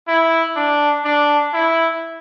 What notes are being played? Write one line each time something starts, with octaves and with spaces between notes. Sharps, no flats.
E4
D4
D4
E4